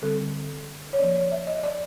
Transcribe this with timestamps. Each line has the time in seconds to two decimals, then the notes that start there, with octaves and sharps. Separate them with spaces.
0.02 D3 G3 C4 A4
0.93 C#5
0.99 F3 A#3 C#4 D5
1.15 D5
1.32 E5
1.47 D#5
1.63 D5